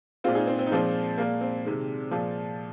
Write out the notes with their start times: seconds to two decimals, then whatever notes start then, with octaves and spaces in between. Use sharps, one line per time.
0.24 G#3 C4 F4
0.28 A#2
0.35 D#4 G#4
0.47 C4
0.59 C4
0.67 D#4
0.71 A#2 F3 G#3 C4
1.18 A#2 G#3 A#3
1.41 C4
1.65 C3 D#3 G#3
2.11 A#2 F3 G#3